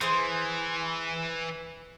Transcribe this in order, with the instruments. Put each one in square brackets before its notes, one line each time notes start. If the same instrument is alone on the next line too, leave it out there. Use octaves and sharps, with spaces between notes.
[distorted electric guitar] E3 [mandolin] G#4 C5 C6